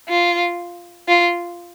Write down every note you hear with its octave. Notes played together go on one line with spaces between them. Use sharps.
F4
F4